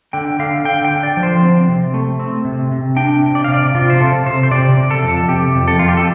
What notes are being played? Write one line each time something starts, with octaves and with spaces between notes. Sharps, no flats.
D3 G5
D3 F5
D3 G5
G5
D3
D5
F3
C5
C4
C3
A3
C4
C3
C3
D4 G5
C3
D5
C3 F5
D5
C3 F4
C5
C3 A4
C3 C5
C5
C3 D5
C3
A4
F2
C3 G4
F2
A4
F2 F4
G4
A4